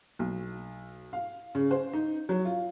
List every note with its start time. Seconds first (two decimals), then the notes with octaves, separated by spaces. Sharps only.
0.19 B1
1.13 F5
1.55 C#3
1.71 C5
1.94 D#4
2.29 F#3
2.45 F4